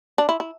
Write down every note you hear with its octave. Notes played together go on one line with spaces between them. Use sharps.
D4
E4
E4